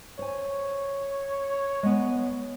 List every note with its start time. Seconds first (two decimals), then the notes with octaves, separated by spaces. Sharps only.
0.19 C5 C#5 G#5
1.83 G#3 B3 C#5